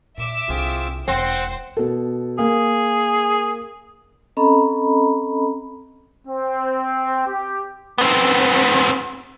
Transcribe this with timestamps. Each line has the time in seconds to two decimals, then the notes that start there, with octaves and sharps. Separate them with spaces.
0.17 A#2 E5 D6 E6
0.49 C2 D3 C4 F4 G#4
1.08 E1 E2 C4 C5 F#5
1.77 B2 A4
2.39 A#3 G#4
4.37 C4 C#4 A4 D#5 A#5 B5
6.28 C4
7.27 G4
7.98 B3 C4